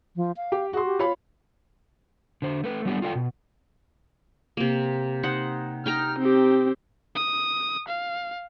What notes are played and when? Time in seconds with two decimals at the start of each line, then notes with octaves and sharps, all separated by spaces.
0.16 F3
0.37 F5
0.52 G4
0.73 F#4 G#4 C6
0.86 G4
0.99 F4 C#5 B5
2.42 D3 C5
2.64 A3 B4
2.85 F#3 G3 B3 D4 F4 G4
3.02 F4 A4 D5 F5 G5
3.15 B2
4.57 C3 A#3
5.23 D#4 C5 F#5
5.86 D#4 G5 A#5 F6
6.19 C4 G4
7.16 D#6
7.88 F5